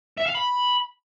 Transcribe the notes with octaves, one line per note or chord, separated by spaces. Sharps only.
E5
F5
B5